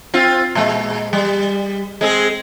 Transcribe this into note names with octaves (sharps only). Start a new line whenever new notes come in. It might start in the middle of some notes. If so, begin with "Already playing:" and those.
C4 F4
A#2 G#3
G3
G#3 C4 G#4